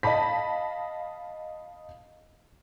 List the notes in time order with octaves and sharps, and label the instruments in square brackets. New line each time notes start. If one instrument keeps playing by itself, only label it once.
[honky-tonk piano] D#5 F5 A5 B5 B6